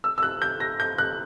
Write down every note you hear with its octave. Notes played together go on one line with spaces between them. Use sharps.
E6
E6
F#6
G6
A#6
G6
F#6